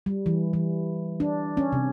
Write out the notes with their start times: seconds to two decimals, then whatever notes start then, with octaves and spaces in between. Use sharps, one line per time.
0.06 G3
0.26 E3
0.53 E3
1.20 D4
1.57 C#4
1.72 C3